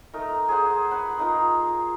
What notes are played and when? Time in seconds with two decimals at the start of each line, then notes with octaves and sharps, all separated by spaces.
0.13 A3 D#4 A#4
0.48 G#4 C5 F#5
0.91 B4 F#5
1.19 D#4 F4 A#4